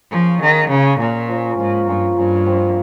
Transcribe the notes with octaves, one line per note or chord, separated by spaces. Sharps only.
F3 A#3 C#4 G#4
D#3 A#3 C#4 G#4
C#3 A#3 C#4 G#4
A#2 A#3 C#4 G#4
F3 A#3 C#4 F4
G#2 F3 A#3 C#4 F4
G2 F3 A#3 C#4 F4
G2 F3 A#3 C#4 F4
F3 C4 F4 C5